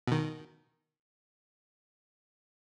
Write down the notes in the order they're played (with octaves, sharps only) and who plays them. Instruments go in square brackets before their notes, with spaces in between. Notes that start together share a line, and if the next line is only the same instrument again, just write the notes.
[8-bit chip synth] B2 D#3